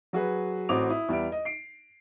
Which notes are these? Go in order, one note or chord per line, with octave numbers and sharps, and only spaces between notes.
F#3 F#4 G#4 B4
A1 C4 F#4 D6 D#6 F7
E4 D#6
E2 G3 B4 E5 D7
D#5
C7 D7